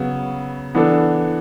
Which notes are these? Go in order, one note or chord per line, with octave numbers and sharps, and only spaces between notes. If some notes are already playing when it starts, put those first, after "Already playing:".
Already playing: C#3 F#3 B3
E3 B3 D4 A4